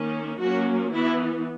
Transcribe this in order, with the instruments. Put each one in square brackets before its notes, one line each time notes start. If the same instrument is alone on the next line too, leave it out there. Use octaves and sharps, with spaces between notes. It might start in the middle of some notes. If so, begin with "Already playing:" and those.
Already playing: [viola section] D#3 A#3 C#4
F#3 A#3 C#4 F#4
E3 B3 E4